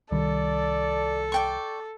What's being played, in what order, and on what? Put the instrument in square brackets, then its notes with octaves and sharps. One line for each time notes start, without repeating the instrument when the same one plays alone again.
[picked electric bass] C2 D#3 G3 [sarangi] A4 [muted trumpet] D5
[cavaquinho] D5 G5 C#6